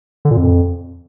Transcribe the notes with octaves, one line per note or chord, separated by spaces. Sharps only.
D3
A#2
F2